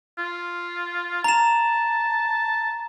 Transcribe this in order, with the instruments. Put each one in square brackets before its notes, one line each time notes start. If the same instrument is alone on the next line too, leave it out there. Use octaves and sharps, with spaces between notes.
[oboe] F4
[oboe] A5 [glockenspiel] A#5 E7